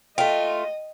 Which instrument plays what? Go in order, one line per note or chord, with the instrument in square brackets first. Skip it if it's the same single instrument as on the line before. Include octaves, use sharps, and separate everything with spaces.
[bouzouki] A3 F4 [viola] D#5 [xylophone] G5